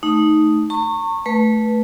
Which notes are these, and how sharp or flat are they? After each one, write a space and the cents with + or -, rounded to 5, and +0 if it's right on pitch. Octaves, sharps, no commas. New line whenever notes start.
A3 +0 D#4 +0
A#5 -45 C#6 -20
A3 +0 B4 -15